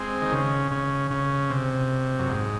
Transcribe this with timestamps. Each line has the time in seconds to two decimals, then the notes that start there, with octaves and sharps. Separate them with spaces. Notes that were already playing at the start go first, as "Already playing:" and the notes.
Already playing: G#3 C4
0.22 D#3
0.32 C#3
0.72 C#3
1.11 C#3
1.50 C3
2.19 F#2
2.29 G#2